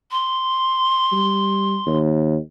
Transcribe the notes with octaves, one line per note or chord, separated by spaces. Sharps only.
C6
G3
D#2